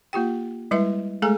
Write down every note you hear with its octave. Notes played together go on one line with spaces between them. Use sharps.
A#3 F4 G4 G5
G3 G#3 E4 B4 D#5 E5
G#3 A3 G#4 A4 G#5 A#5